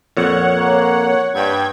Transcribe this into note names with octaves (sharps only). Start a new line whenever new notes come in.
F2 A#2 C#5 F#5
A#3
G2 G5 G#6